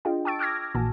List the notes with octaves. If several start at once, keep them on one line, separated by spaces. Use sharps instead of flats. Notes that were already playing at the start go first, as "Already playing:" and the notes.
D4 F4 G#4 D#5 G5
G5 A5 C#6 E6 A6 D7
D6 E6 F6 G#6 A#6
A#1 A#2 E3 F#4 G#5 A5